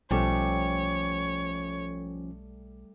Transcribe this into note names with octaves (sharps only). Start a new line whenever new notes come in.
B1 F3 G3 A3 C#4 C#5